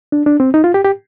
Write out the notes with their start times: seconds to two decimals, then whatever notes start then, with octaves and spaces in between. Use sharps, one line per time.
0.12 D4
0.26 D4
0.40 C4
0.54 D#4
0.64 F4
0.74 G4
0.85 G4